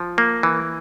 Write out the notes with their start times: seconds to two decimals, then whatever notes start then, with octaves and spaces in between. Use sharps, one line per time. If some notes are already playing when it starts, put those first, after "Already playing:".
Already playing: F3
0.18 A#3
0.43 E3